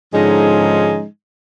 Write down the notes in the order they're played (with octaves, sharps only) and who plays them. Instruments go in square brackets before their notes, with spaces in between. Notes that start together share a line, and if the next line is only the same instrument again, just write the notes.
[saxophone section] G#2 D3 F3 G#3 C#4 D#4